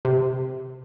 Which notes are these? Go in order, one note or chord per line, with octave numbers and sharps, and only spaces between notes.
C3